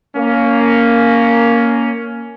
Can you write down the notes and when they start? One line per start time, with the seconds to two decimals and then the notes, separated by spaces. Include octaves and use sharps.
0.17 A#3 C#4